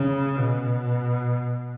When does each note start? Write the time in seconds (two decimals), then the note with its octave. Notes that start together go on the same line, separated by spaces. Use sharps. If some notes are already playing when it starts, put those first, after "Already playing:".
Already playing: C#3
0.37 B2